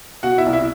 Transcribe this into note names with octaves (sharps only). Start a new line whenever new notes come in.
B2 F#4 F#5
E4 E5
C2
E4 E5